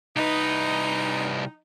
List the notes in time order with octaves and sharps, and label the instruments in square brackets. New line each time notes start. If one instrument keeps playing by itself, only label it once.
[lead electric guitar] C2 B4 [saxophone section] D#4